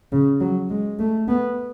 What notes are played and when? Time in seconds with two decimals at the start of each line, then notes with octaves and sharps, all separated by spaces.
0.12 C#3
0.41 F#3
0.70 G#3
0.99 A3
1.28 B3